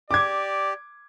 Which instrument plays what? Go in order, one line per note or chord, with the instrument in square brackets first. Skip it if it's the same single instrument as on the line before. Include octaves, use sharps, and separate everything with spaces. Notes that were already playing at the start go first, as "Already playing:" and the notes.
[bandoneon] G4 [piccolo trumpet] D5 [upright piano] D6 G#6